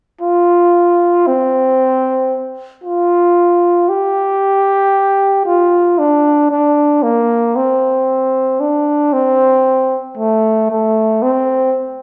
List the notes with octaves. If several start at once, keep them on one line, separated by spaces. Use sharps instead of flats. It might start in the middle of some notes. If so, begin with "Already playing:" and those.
F4
C4
F4
G4
F4
D4
D4
A#3
C4
D4
C4
A3
A3
C4